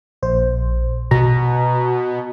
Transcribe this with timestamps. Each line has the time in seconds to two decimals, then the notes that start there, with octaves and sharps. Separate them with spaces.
0.22 A#1 C5
1.11 B2 A#5